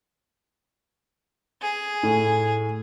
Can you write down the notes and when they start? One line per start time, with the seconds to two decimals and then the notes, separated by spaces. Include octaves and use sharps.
1.62 G#4
2.03 A2